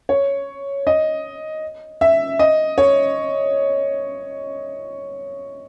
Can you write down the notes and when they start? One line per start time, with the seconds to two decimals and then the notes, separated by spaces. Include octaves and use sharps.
0.09 C#5
0.87 D#5
2.01 E5
2.39 D#5
2.78 C#5